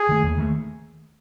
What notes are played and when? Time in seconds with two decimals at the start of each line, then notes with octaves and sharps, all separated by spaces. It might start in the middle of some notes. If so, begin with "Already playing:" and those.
Already playing: G#4
0.09 D#3 A3
0.23 D#2
0.38 D#3 A3